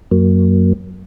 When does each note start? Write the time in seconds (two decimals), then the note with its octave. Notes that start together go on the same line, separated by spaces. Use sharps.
0.11 F#2 F#3 A#3